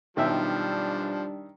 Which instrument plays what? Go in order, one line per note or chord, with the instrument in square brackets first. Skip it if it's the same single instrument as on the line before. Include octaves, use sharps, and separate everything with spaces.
[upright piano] B1 B2 [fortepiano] D#3 E5 G5 [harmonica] F3 [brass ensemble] G3 D4